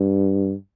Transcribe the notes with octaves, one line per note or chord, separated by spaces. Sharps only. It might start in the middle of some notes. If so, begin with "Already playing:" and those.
Already playing: G2